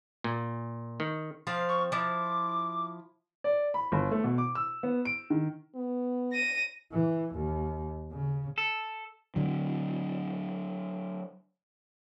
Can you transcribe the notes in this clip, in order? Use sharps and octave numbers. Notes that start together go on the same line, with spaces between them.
A#2
D#3
F3 C4 F5
C#6
F3 E4 D6
D5
B5
G1
A3
B2
D6
E6
B3
D7
D#3
B3
A#6 D#7
E3
D#2
C#3
A4
D3 F#3